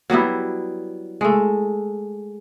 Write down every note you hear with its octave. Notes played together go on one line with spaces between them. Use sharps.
F#3 G3 B3 E4
G#3 A3